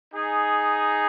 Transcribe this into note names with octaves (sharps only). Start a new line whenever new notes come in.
D#4 G#4